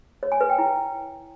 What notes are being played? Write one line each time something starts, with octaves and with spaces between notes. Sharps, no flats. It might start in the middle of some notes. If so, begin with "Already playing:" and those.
C#5
G#5
B4
G5
E4